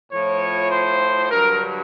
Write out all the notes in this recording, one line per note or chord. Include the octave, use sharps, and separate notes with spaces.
A2 F3 C#5
C5
G2 D3 F#3 A#4